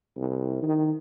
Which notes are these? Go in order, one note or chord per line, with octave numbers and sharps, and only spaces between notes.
C2
D#3